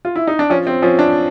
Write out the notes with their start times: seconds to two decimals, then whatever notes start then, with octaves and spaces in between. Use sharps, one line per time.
0.05 F4
0.16 E4
0.27 D#4
0.39 D4
0.50 F3 C#4
0.67 C4
0.82 F3 C#4
0.99 D4